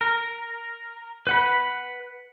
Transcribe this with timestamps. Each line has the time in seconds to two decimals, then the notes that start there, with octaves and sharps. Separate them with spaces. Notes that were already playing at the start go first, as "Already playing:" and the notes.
0.01 A#4
1.27 B4 F#5 B5